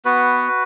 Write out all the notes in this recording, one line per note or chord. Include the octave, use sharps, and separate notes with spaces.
B3 F#4 B4